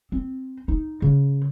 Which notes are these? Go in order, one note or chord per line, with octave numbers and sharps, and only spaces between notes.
C4
D#4
C#3